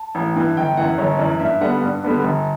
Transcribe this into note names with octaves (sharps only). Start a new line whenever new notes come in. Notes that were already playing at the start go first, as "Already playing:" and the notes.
Already playing: A5
A1
G2 E3
G1 G5
F#2 E3 F#5
G1 C#5
F#2 E3 D5
G2 E5
D3 G3 B3 D4 F#5
G2 F#5
D3 G3 B3 D4
G1